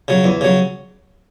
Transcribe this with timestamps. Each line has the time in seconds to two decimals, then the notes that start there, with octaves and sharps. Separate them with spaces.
0.08 C#3 F#3
0.24 E2
0.41 C#3 F#3